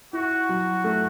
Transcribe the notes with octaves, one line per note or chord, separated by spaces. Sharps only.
E4 F#4
F#3
A3